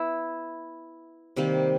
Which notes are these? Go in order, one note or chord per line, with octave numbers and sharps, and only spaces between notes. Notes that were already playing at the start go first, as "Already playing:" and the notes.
Already playing: B3 E4
C3 D#3 G3 A#3